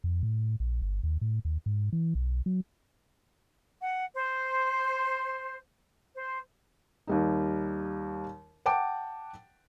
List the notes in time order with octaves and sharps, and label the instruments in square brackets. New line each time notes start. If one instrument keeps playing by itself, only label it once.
[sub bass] F2
A2
A#1
G1
D#2
A2
D#2
G#2
E3
B1
F#3
[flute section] F#5
C5
C5
[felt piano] D#2 G3 D#4
F#5 G5 A5 D6 D7